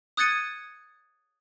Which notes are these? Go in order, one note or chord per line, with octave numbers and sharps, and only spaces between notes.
D#6 F#6 G#6 A6 C#7 D#7